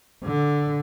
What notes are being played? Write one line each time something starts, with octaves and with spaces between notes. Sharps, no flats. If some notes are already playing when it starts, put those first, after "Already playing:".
D3